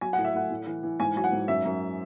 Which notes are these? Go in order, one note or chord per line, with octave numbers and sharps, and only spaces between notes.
F#3 G#5
A2 F#5
E5
A2 F#5
A2
E3
E3
G#2 G#5
F#3 G#5
F#5
G#2
F#2 E5
F#2